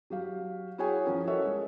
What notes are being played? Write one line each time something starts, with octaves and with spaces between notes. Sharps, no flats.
F#3 G4 F5
E4 F#4 G#4 C#5 G5 G#5
F3 C#4 A#4
F#4 A4 A#4 C#5 D#5 E5
G#3